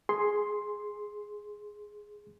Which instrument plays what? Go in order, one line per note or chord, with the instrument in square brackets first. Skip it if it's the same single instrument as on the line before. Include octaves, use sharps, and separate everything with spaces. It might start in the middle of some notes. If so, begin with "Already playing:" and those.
[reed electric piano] G#4 C6